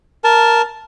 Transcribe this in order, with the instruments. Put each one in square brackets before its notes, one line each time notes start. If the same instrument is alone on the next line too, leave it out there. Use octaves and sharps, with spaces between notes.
[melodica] A#4 A5